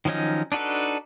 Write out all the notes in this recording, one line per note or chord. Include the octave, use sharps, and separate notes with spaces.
D#3 F3 F#3 C#4 D#4
D4 D#4 F#4 A4 B4